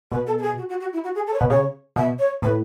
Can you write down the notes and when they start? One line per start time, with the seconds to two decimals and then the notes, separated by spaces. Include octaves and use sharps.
0.11 B2 B4
0.27 A4
0.38 A4
0.42 G#4
0.57 F#4
0.69 F#4
0.81 F#4
0.93 E4
1.04 F#4
1.15 G#4
1.27 A4
1.33 C#5
1.39 B2 B4
1.50 C#3 C#5
1.96 B2 E5
2.19 C#5
2.42 A2 B4